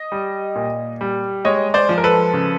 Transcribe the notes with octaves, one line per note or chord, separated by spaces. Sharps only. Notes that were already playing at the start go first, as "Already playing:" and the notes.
Already playing: D#5
G3
A#2
G3
G#3 C#5 D#5
C5 D5
F3
A#4
A4 B4
C#3